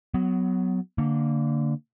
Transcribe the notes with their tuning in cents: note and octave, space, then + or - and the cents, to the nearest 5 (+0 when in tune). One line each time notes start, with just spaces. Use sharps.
F#3 +0 B3 +20
D3 +0 A#3 -20